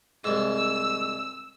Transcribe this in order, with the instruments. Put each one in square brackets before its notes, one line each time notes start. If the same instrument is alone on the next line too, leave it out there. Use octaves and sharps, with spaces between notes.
[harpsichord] C2 G#2 [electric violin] E6